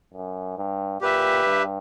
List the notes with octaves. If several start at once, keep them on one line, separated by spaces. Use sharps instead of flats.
F#2
G2
A#2 G4 B4 E5
G2